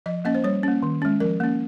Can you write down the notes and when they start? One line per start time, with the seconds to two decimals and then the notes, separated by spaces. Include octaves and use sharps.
0.06 F3 D#5
0.25 A#3 C#4 D#5
0.35 C5
0.44 G3 C#5
0.63 A#3 C#4
0.83 D#3
1.02 G#3 C#4
1.20 F3 A#4
1.40 A#3 C#4